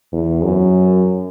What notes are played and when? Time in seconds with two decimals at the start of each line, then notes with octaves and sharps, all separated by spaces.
0.12 E2
0.43 F#2